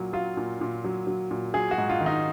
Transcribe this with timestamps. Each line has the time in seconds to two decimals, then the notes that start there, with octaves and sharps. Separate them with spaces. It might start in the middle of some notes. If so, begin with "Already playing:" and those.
Already playing: A#2 F#3
0.13 F#3 F4
0.37 A#2
0.61 A#2
0.84 F#3
1.07 F#3
1.31 A#2
1.54 F#3 G#4
1.71 F#4
1.78 G#2
1.90 F4
2.00 D#3
2.06 D#4